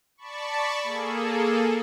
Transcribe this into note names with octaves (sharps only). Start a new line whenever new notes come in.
D5 A5 B5 C#6
A#3 G#4 A4